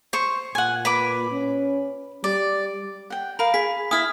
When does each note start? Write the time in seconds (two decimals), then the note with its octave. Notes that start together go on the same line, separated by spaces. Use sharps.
0.13 C5 C#6
0.55 A#2 F#5 G#5
0.85 B4 B5 D6
1.31 C#4
2.24 G3 D5
3.10 F#5 G5
3.39 A#4 F5 B5
3.54 G#4 B6
3.91 E4 G#5 D#6 F6